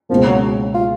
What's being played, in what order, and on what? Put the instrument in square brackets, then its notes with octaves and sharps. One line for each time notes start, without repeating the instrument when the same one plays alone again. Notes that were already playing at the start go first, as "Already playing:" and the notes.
[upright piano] C#2 B2 A#3 [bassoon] F3
[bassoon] F#3
F4